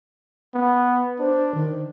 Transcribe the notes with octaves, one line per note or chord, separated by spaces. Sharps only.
B3
D4 C5
D#3